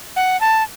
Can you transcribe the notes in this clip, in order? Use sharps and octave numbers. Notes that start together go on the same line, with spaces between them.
F#5
A5